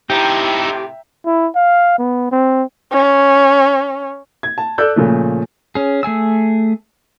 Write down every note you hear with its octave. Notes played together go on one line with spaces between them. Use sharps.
A2 C3 D#4 E4 G4 E5 G5 A#5
E4
F5
B3
C4
C#4
G#6
A5
A4 D5 E6 F#6 G6
A#2 C#3 F3 A3
C#4 G#4
A3 G#4 G#5 E6